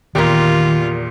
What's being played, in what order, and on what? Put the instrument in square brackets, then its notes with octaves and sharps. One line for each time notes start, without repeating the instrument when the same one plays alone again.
[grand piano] E2 A#2 [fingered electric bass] D#3 [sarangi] F4 [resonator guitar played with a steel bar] G4 A#4